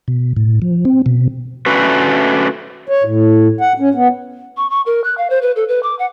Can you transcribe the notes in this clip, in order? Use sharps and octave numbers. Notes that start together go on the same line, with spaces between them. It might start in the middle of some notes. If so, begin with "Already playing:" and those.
B2
A2
F3
C4
B2
A3 C#4 D4 F#4 B4
C#5
A2
F#5
C#4
B3
C#6
C#6
A#4
F#6
F5
C5
B4
A4
B4
D6
F#5